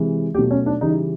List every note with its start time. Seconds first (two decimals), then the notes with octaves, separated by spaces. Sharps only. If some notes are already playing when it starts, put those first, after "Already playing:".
Already playing: C3 E3 G#3
0.34 B2 F#3 A3 G4
0.51 C#4
0.66 D4
0.81 C#3 E3 G3 D#4